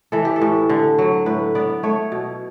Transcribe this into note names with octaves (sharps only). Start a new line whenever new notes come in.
E3 A4
G4
A4
A2
D3
F#3
A2 B4
B3 D5
A3 C#5
B2